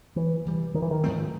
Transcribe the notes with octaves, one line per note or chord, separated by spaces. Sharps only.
E3
C3 E3 G3
D#3
E3
D#3
G#2 F3 A3 C4